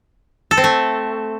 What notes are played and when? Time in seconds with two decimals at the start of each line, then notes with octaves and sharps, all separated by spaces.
0.51 A4
0.57 C4
0.64 A3